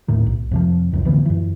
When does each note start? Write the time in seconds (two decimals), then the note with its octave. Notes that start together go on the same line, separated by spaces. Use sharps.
0.08 D#2 A2 D#3
0.26 B1
0.51 F2 C3 F3
0.92 F#1 C#2 F#2
1.05 D1 D2 E3 B3
1.25 F#2 E3